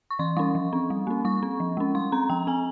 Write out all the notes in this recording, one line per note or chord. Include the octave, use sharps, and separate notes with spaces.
C#6
E3 C6
G3 C#4 C#6
F3
C4
G3
A#3 C#4
G3 C#6
C4
F3
G#3 C#4
G3 C6
C4 A#5
F3 G5
C4 G#5